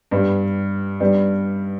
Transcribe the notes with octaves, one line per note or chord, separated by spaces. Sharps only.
G2 G3 B3 D4
G3 B3 D4